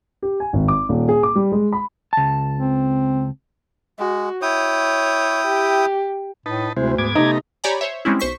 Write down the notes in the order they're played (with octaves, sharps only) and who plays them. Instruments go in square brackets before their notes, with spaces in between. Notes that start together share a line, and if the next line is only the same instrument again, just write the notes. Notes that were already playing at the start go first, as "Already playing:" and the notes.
[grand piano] G4
G#5
G#1
D6
D#1
G#4
D6
G3
G#3
B5
[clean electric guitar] C#2 A5
[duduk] C4
[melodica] G#3 [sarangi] F#4
[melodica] E4 G5 D#6 [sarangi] C#5
[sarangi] G4
[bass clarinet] A2 [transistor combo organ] D#4 B4 A5
[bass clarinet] D2 [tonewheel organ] C3 E4 C5 [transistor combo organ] G#3
[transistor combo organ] G#2 B3 [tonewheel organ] D6 G#6
[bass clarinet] C3 [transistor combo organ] A3 B3 A#5 [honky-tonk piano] D#4
[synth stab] G4 C#5 D5 G#5 A#5 B5
C5 C#5 E5
G3 G#3 C4 C#4 E4
B1 C5 C#6 B6